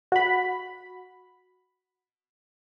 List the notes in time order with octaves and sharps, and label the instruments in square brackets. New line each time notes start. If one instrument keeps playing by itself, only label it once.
[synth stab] F#4 B5